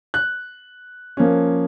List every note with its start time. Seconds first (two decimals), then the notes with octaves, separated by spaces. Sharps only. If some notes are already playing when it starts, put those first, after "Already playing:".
0.14 F#6
1.17 F3 A#3 C#4